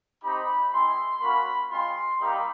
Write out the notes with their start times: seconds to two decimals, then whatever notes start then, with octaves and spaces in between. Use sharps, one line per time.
0.23 C4 D#4 G4 B5
0.72 G#3 C4 E4 C6
1.21 A#3 C#4 F#4 B5
1.71 G#3 C4 F4 C6
2.19 G3 A#3 D#4 G4 B5